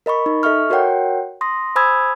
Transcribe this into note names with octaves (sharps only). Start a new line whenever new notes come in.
A#4 D#5 B5 C#6
D#4
A4 D#5 E5 C#6 F6
F#4 A#4 C#5 F#5 G5
C6 D#6 A#6
C5 G#5 B5 D#6 E6 G#6